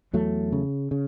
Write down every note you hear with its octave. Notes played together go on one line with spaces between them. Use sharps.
E2 F#3 A3
C#3
C#3